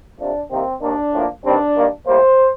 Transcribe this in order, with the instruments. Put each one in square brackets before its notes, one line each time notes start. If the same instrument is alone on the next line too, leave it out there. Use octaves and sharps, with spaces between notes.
[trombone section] F2 C3 F3 A3 D4
C2 C3 D#3 A#3 C4
D#2 D#3 A#3 D4
A2 F3 A#3
G2 D#3 G3 C4 D4
G2 D#3 A#3
A2 G3 A#3 C5